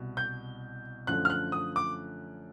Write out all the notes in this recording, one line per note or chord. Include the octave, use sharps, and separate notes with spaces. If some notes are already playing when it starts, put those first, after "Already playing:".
Already playing: C2 B2
G6
F#2 D3 F3 A3 F#6
F6
F#6
D#6
D6